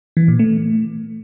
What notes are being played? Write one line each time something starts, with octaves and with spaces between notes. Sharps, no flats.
E3
A#2
A3